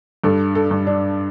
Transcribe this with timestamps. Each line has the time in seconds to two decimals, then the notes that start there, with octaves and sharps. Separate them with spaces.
0.24 G2 A4
0.55 A4
0.71 G2
0.87 D4